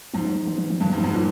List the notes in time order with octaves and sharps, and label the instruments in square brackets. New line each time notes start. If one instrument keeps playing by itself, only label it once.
[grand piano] G#2 [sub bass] F3
[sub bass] F#3
E3
E3
F3
[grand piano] G2 [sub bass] D#3
[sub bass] E3
[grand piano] G#2
[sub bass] F#3
[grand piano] G#2 [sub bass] F3
[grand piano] A#2 [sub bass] F#3